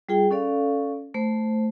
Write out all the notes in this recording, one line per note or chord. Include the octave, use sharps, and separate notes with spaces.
G3 F4 G#4 G5
C#4 A4 D5 F5
A3 C5